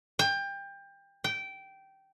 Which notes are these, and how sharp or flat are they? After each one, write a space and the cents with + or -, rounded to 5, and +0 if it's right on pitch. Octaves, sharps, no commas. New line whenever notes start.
G5 +25
G5 -15